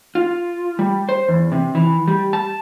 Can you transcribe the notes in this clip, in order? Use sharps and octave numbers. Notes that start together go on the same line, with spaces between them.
F4
G3
C5
E2
C3
E3
G3
A5